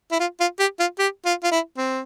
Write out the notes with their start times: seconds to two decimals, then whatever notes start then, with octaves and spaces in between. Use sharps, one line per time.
0.12 E4
0.20 F4
0.40 F4
0.60 G4
0.80 F4
0.99 G4
1.26 F4
1.44 F4
1.52 E4
1.77 C4